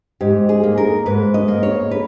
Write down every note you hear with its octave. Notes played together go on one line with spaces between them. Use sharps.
G#2 G4
G#4
A#3
A#4
G#2 B4
D#5
A#3
C#5
B4